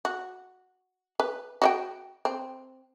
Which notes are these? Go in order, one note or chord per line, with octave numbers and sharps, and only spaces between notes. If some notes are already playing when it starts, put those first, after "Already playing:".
F#4
B4
F#4 D#5 G5
C4